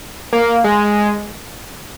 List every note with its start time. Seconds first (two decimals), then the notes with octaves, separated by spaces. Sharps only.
0.33 A#3
0.64 G#3